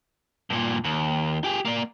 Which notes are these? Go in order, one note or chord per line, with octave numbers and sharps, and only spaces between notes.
G2 A#2
D#2
G4 G#4
A#3 D5